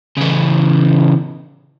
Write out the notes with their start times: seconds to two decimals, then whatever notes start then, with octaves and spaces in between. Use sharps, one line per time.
0.17 C#3 E3